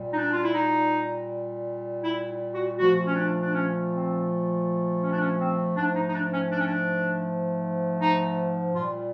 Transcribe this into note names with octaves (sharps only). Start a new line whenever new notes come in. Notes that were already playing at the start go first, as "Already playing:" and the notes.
Already playing: A#2 G3
D#4
D4
F4
E4
D#4
E4
F#4
A#2 F3 A3 F#4
C#4
D4
D4
C#4
C4
C#4
D4
C#4
C4
G#2 F3 A3 D4
D#4
D#4
D4
C#4
D4
C#4
D4
D#4
A#2 G3 F4